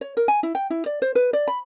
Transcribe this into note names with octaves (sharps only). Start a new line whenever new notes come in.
C#5
A#4
G#5
E4
G5
E4
D5
C5
B4
D5
B5